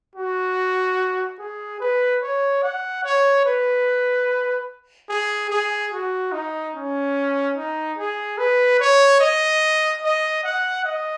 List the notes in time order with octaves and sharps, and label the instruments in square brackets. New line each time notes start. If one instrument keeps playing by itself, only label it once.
[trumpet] F#4
G#4
B4
C#5
F#5
C#5
B4
G#4
G#4
F#4
D#4
C#4
D#4
G#4
B4
C#5
D#5
D#5
F#5
D#5